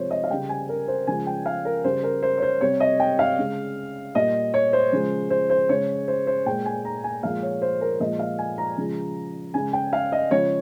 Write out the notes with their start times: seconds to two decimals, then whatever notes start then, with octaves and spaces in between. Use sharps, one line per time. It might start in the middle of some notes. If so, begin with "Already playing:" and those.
Already playing: C3 F3 G#3 C5 C#5
0.11 D#5
0.24 F5
0.30 C#3 G3 G5
0.49 G#5
0.69 A#4
0.88 C5
1.07 C#3 F3 G#3 G#5
1.27 G5
1.46 F5
1.65 A#4
1.84 C#3 G3 C5
2.03 A#4
2.23 C5
2.38 C#5
2.42 C5
2.61 C3 G3 C#5
2.80 D#5
3.00 G5
3.19 F5
3.38 C#3 G#3
4.15 A#2 G3 D#5
4.54 C#5
4.73 C5
4.92 C#3 F3 G#3
5.30 C5
5.50 C5
5.69 C#3 G#3 C#5
6.08 C5
6.27 C5
6.46 A#2 G#3 G5
6.66 G#5
6.85 A#5
7.04 G#5
7.23 A#2 F3 G#3 F5
7.42 C#5
7.62 C5
7.81 A#4
8.00 A#2 F3 G#3 D#5
8.19 F5
8.39 G#5
8.58 A#5
8.77 C#3 F3 G#3
9.54 C#3 G#3 G#5
9.73 G5
9.93 F5
10.12 D#5
10.31 C#3 F3 G#3 C#5